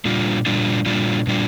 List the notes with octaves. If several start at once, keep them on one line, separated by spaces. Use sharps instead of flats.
A#2 G3 D4 F4
A#2 G3 D4 F4
A#2 G3 D4 F4
A#2 G3 D4 F4